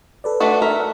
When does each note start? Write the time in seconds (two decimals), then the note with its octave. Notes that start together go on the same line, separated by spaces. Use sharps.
0.24 A4 B4 D5
0.40 A3 D4 F#4
0.62 A#4 E5